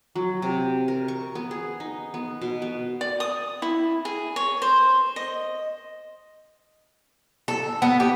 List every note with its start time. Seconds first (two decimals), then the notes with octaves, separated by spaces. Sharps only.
0.15 F#3
0.42 C3
0.88 A#4
1.08 C#6
1.35 B3
1.51 G#4
1.80 D#4
2.14 B3
2.41 B2
2.62 B3
3.01 D5
3.20 D#6
3.62 E4
4.05 G#4
4.36 C#5
4.62 C5
5.16 D#5
7.48 A4
7.82 B3
8.00 G4